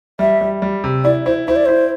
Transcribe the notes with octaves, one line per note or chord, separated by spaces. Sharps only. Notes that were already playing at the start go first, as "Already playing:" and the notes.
G3 E5
G3
G3
C3
E4 D5
E4 C5
E4 C5
D5
E4 C5